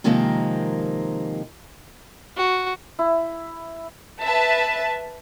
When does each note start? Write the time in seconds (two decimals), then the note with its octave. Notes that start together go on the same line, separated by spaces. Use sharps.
0.04 C3 D#3 F3 G#3 A#3 C4
2.37 F#4
2.99 E4
4.22 B4 E5 A5